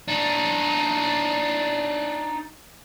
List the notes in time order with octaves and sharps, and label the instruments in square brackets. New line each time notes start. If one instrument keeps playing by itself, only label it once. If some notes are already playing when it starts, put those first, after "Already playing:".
[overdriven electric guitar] D4 D#4